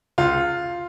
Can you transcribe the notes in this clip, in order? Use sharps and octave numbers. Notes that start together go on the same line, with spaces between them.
C#2 F4